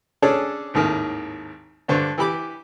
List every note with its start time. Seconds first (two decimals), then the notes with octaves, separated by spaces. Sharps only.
0.22 C#4 D4 G#4 A4 C#5
0.74 G#1 D#2 A2 D#3
1.88 G2 D3 C5 C#6
2.18 E3 G4 B5 D6